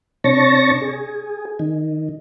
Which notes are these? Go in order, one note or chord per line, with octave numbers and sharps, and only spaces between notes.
C3 D4 C#5 A5 C#6 A#6
G#4
D#3